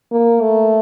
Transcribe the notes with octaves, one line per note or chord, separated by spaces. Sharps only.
A#3
A3